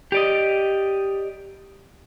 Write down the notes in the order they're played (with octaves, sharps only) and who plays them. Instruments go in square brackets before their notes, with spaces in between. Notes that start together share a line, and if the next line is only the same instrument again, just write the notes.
[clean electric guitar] G4 D5 D#5